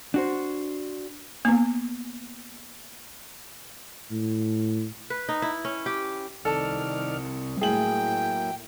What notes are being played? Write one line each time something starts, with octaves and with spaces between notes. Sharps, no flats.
D4 F#4 C5
A#3 B3
A2
B4
D#4
E4
C#4
G4
C2 D#3 A4 D5 F6
A2 F#3 A#3 E4 G#4 G5 F#7